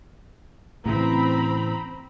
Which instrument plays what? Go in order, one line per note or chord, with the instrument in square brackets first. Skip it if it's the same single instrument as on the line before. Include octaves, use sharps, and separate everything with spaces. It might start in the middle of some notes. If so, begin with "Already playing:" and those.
[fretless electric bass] A2 C#3 E3 [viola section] C4 A#5 B5